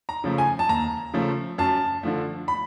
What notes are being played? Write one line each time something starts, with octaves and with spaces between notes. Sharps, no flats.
A#5
C#3 F3 A3
G#5
A5
D#2 A#5
C#3 F3 A3
F#2 A5
D3 F3 A3
B5